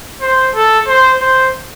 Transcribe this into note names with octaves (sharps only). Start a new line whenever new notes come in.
C5
A4
C5
C5